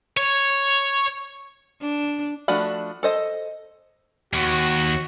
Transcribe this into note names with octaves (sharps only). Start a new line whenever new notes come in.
C#5
D4
F3 A3 D4 F#4 B5
A4 C5 D#5
D#2 F#4